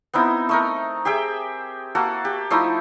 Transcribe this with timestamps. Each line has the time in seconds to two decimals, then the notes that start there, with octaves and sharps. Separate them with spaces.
0.14 B3 C4 D#4 E4
0.49 A3 D#4 A#4
1.05 G4 G#4 E5 G5
1.95 A#3 F#4 A4
2.25 G4
2.50 F3 A3 D#4 E4